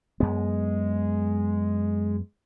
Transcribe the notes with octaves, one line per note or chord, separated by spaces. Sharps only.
F#2 G#3 B3